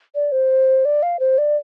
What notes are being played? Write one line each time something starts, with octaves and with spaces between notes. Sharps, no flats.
D5
C5
D5
F5
C5
D5